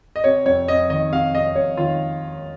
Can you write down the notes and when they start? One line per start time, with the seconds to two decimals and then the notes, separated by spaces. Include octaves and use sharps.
0.16 D#5
0.24 C3 C#5
0.46 F2 C#5
0.68 F2 D#5
0.90 D#3 D#5
1.12 C3 F5
1.34 F2 D#5
1.55 F2 C#5
1.77 D#3 F4